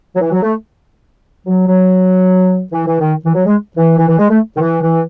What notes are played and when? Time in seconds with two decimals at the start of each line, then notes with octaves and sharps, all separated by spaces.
0.16 F#3
0.21 E3
0.32 F#3
0.43 A3
1.47 F#3
1.67 F#3
2.72 E3
2.87 E3
3.01 D#3
3.25 E3
3.35 F#3
3.46 G#3
3.77 E3
3.98 E3
4.09 E3
4.19 G#3
4.30 A3
4.57 D#3
4.61 E3
4.82 E3